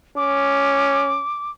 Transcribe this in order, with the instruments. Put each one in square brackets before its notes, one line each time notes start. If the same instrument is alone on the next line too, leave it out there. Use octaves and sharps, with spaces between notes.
[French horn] C#4 [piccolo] D6